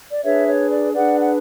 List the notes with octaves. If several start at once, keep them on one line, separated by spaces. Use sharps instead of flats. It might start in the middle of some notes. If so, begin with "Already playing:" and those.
D5
D4 G#4 B4 C#5 E5
C#5
D5
D4 G#4 B4 D5 F#5
F#5